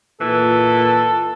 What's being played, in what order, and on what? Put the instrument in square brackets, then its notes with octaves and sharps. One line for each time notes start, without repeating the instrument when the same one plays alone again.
[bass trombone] A#2 [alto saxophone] E3 [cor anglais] A4